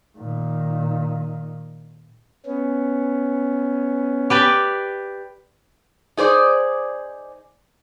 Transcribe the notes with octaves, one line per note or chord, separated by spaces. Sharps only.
A#2 D#3
B3 C#4
G4 B4 D5
D#4 G#4 C5 D5